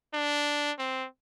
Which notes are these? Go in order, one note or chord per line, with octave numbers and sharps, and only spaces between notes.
D4
C4